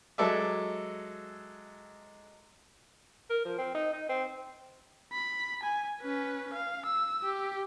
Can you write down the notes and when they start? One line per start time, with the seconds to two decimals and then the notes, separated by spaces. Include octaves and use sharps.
0.18 F#3 G#3 A4 D5 E5
3.30 A#4
3.45 F3
3.58 C4
3.75 D#4
3.93 D#4
4.09 C4
5.13 B5
5.63 G#5
6.01 C#4 B4
6.54 F5
6.85 E6
7.23 G4